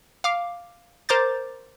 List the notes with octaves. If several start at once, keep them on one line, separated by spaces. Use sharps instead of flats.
F5 D6
A#4 C5 A#5 D6 G6 A6